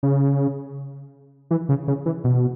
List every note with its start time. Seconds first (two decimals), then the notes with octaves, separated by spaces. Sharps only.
0.03 C#3
1.51 E3
1.69 C#3
1.88 C#3
2.06 E3
2.24 B2